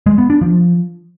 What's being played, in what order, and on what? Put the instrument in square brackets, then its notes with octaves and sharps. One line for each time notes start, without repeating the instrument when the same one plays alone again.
[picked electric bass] G#3
B3
D4
F3